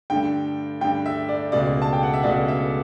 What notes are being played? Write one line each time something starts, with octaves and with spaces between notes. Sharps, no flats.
G2 D3 A3 G5
G2 D3 A3 G5
E5
D5
C#2 B2 A3 D5
A5
G5
F#5
E5
C#2 B2 A3 D5
E5